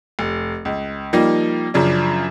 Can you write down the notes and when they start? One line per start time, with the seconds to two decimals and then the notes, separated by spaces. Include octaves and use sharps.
0.19 F1
0.65 C#2
1.13 F3 G3 A#3 D#4
1.74 F#2 C#3 F3 D4